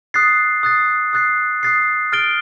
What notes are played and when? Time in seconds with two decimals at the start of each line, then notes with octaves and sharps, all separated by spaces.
0.14 D#6 F#6 A6 C7
0.63 D#6 F#6 A6 C7
1.13 D#6 F#6 A6 C7
1.63 D#6 F#6 A6 C7
2.12 F6 A6 D7 G7